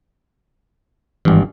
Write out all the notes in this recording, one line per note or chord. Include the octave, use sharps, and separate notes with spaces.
G#1 G2 E3